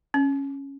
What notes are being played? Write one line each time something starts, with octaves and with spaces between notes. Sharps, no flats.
C#4